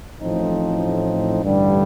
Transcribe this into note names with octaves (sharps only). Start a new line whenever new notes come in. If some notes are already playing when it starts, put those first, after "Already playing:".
A1 A2 F3 C4 D#4
A1 G2 D3 G3